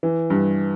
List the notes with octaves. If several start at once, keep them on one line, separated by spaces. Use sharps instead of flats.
E3
G2